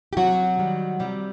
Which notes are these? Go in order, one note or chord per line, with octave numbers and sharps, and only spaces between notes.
G4
C3 F#3 F#4
D#3 G3
C3 G3 G4